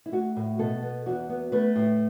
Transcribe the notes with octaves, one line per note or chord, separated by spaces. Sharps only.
E4
A3 F#4
A2
B2 A4
B3
E2 F#4
B3
A3 B4
A2